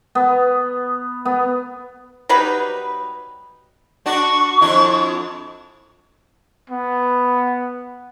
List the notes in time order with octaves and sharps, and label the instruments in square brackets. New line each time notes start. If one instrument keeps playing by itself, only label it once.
[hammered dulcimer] B3
B3
[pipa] F#3 G3 D#4 B4
[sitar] D4 F#4 D5 [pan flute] C#6
[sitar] F2 D4 E4
[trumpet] B3